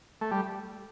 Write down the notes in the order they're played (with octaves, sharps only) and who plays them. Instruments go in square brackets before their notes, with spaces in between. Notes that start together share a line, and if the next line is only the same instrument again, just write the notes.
[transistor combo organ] A3
G3